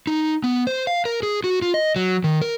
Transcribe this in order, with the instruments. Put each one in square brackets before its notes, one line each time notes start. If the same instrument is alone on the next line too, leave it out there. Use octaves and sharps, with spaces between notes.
[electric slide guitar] D#4
B3
C5
F5
A#4
G#4
F#4
F4
D#5
F#3
D#3
A#4